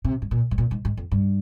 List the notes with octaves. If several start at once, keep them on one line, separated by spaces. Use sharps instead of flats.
C3
G#2
A#2
G#2
A#2
G#2
G#2
F2
G2